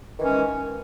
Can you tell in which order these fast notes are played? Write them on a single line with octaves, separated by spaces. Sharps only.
D#3 E3 C#4 G#3